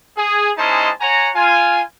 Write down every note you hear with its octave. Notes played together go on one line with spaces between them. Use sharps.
G#4
G#3 C#4 D#4 E4 C5 A5
C#5 F#5 G#5 A#5
F4 G#5